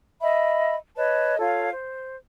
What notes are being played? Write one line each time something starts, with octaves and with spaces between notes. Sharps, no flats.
D#5 E5 B5
B4 C#5 D#5 A5
F4 A4 C#5 F5
C5